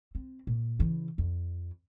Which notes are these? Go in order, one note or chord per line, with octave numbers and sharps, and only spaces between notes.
C4
A#2
C#3 E3
F2